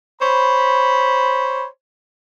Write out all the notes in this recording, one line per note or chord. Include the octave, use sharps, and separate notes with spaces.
C5 C#5 B5